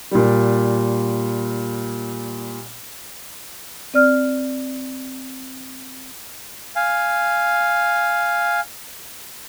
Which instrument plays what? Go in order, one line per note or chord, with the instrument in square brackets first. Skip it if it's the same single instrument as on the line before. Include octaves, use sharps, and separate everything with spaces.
[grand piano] A#2 G3
[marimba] C4 D5 F6
[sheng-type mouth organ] F5 G#5